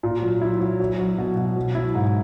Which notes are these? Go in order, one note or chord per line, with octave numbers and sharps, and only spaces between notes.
A#2
F#3
E4
F#3
F#3
F#3
B2
B2
F#3
E4
G#2